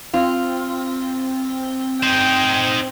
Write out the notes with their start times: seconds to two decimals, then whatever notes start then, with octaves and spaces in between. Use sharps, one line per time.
0.13 C4 F4
2.03 D#4 C5 G5